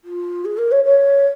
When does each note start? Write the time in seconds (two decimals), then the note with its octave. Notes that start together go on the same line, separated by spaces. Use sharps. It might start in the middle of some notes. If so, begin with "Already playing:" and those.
0.04 F4
0.45 G#4
0.58 A#4
0.72 C#5
0.84 C#5